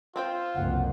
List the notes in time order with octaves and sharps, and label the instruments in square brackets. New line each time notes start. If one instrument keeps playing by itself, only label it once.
[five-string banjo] C4 C5 G5 [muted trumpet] F4
[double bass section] F#1 C2 F2 [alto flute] F#5